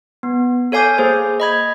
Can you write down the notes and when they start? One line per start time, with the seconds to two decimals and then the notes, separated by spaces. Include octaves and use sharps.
0.23 B3
0.72 A4 C#5 F5 G#5 D6 G6
0.98 A#3 G#4 C5
1.40 D#5 B5 G#6